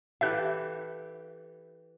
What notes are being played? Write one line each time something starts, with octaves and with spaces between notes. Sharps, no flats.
E3 G4 A4 E5 F#6